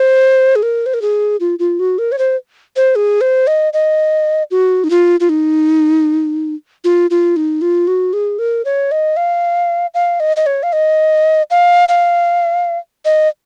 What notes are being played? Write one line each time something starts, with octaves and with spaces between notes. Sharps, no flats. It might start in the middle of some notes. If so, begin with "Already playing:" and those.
Already playing: C5
G#4
A#4
C5
A#4
G#4
F4
F4
F#4
A#4
C#5
C5
C5
G#4
C5
D#5
D#5
F#4
D#4
F4
F4
D#4
F4
F4
D#4
F4
F#4
G#4
A#4
C#5
D#5
F5
F5
D#5
D#5
C#5
F5
D#5
F5
F5
D#5